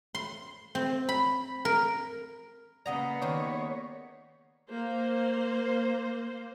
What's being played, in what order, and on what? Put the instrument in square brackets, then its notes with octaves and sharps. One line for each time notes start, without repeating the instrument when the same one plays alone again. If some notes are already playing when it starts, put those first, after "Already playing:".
[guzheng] C6
C4
B5
A#4
[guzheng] C#3 D#5 A#5 [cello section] A#3 B3 [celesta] D5 F#5
[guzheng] D#3 G#3 G4 [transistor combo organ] C#5
[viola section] A#3 C5